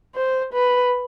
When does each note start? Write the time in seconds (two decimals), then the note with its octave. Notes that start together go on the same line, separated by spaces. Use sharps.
0.15 C5
0.54 B4